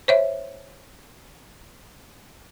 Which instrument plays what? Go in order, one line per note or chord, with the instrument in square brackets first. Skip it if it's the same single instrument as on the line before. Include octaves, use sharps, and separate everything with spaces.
[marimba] C5 C#5 E5